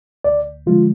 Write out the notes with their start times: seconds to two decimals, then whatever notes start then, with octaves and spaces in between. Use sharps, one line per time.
0.24 D2 D5
0.66 D3 F3 G#3 F4